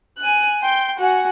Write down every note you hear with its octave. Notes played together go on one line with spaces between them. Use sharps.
G#5 F#6
G5 C6
F#4 F#5 G#5